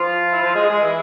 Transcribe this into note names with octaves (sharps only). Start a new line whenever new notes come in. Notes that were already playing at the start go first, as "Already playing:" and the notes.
Already playing: F3 F4
E4
F3 F4
G#3 G#4
G#3 G#4
E3 E4